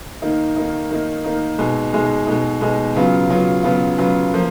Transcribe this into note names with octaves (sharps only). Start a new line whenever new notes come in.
D#3 A#3 D#4
D#3 A#3 D#4
D#3 A#3 D#4
D#3 A#3 D#4
B2 G#3 D#4
B2 G#3 D#4
B2 G#3 D#4
B2 G#3 D#4
C#3 F#3 B3 F4
C#3 F#3 B3 F4
C#3 F#3 B3 F4
C#3 F#3 B3 F4
F3 A#3